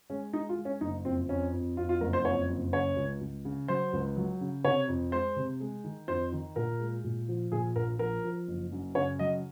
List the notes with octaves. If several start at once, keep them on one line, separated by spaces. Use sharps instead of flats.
G#3 C#4
G#3 D#4
F4
G#3
C#4
F#1 D#4
F2 C4
F2 C#4
F2
F2 F4
F4
F#1 A#4
C5
F2 C#5
F#1
C#3 C#5
C#2
C#2
C#3
F#3 C5
C#2
F#3
C#3
C3 C#5
F2
G#3 C5
C3
G#3
D#3
F2 C5
D#3
A#2 A#4
G#3
A#2
F3
A#2 G#4
A#1 A#4
F3 A#4
F3
F#1
F#2
C#3 C#5
F#3 D#5